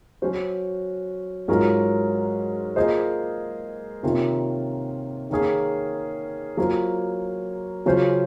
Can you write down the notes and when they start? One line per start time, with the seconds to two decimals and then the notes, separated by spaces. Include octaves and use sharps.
0.22 F#3 C#4 F#4 C5
1.48 G#2 F#3 C#4 F4 A#4
2.76 A#3 F4 G#4 C5 D#5
4.03 C3 D#3 A#3 C#4 F4
5.30 D#3 A#3 C#4 G#4
6.57 F#3 A#3 C#4 F4 C5
7.86 C#3 F#3 C#4 F4 C5